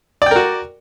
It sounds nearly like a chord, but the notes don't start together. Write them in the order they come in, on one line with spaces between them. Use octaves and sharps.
D5 G5 A#4 F#4